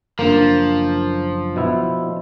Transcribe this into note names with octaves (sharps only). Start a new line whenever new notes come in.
F#1 F3 A#3 D4
B2 E4